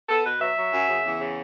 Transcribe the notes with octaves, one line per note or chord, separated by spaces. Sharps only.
B3 A4
B2 B4
F#3 E5
F#3
F#2
C#3
E2
C#3